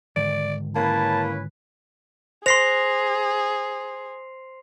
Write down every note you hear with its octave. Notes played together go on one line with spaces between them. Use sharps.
G#2 D3 D#3 D5
A#3 C#4 E4 B4 A5
G#4 C5 C6 A#6 C7 F7